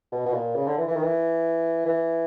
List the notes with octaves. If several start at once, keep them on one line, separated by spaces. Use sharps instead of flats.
B2
B2
A#2
C#3
D3
E3
E3
D#3
E3
E3